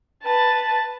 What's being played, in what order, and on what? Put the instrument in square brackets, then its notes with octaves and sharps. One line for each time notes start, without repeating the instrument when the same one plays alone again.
[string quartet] B4 A5